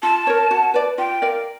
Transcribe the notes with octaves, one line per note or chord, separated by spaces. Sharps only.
F4 A5
A#4 C#5
F#4
B4 D5
F4 G5
A#4 D5 F5